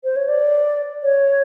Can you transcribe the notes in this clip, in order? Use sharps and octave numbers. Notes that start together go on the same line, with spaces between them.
C5
C#5
D5
C#5